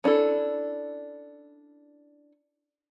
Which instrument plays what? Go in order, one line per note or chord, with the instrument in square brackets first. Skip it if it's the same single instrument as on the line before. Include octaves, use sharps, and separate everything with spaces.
[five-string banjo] C#4 D4 E4 A4